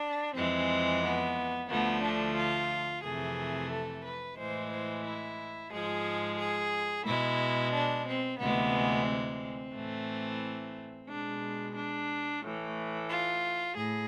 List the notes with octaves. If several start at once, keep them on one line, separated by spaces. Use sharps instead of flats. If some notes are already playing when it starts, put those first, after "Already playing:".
Already playing: D4
F2 E3 G#3 C4
B3
D2 D3 F3 A3 B3
D4
F4
F2 C3 E3 A3 G#4
A4
B4
A2 E3 G#3 C5
C5
E4
G#2 F3 G#3 G#4
G#4
B2 G#3 E4
D4
C4
D2 C3 E3 G#3 B3
C4
A2 E3 A3
B2 G#3 D4
D4
A2 E3 A3
F4
A2 G#4